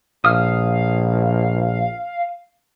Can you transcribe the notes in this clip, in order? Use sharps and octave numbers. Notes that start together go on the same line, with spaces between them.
A#1 F5 D#6 F6